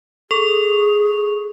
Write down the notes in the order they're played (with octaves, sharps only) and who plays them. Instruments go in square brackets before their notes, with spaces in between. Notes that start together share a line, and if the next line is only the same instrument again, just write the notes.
[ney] G#4 [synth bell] A4 C#6 F7